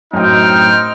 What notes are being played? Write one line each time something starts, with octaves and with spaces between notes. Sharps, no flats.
F#2 A2 C4 D#4 D#5 G5 F6